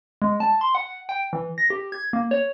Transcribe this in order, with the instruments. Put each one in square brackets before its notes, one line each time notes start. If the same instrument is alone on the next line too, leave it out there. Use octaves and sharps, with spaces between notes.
[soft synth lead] G#3
A5
C6
F#5
G5
E3
A#6
G4
G#6
A#3
C#5